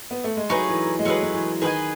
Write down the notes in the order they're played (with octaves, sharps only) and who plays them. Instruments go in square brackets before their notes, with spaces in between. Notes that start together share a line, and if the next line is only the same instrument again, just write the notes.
[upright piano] B3
A3
G#3
[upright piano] F#3 [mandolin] A3 D#4 G#4 B4
[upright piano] E3
E3
G#3
[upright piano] F#3 [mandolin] A3 D#4 G#4 B4
[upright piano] F#3
E3
[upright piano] D#3 [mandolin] G#4 B4 D#5 G#5